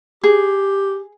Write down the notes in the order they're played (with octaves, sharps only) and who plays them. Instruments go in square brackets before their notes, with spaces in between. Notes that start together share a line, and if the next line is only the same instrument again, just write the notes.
[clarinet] G4 [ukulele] G#4